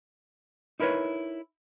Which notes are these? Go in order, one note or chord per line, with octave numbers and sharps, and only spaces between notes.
D#4 E4 A#4 B4 C#5